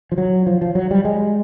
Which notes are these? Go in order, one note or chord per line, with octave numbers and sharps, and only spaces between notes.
F3
F#3
F3
F3
F#3
G3
G#3